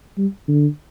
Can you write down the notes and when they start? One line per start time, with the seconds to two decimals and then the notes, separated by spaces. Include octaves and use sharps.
0.18 G3
0.48 D3